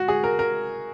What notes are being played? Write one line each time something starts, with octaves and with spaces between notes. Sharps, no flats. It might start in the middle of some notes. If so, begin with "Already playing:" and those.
Already playing: F#4
G#4
A#4
A#4